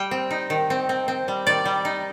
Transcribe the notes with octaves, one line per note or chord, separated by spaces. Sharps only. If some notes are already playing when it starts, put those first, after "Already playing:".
Already playing: G3 G5
C4
D#4
D#3
C4
C4
C4
G3
D#3 D5
G3
D#4